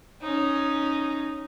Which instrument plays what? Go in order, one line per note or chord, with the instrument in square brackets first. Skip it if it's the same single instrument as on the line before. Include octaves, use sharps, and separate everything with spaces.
[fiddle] C#4 D#4